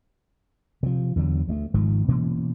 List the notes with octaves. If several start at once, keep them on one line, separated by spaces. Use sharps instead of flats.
C3 F3
E2 D3 D#3 F#3
D2 G#3 A3
G#1 G#2 D#3 F3
B2 E3 A#3 C#4